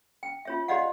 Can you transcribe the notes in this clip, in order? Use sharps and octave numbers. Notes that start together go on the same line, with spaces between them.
G5
F4 C#5 E5
G4 C5 D5 D#5 F5 F#5